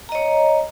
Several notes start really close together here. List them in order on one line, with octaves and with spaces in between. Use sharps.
A#5 D#5 C#5